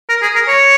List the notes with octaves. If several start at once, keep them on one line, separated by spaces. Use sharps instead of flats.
A#4
G#4
A#4
C#5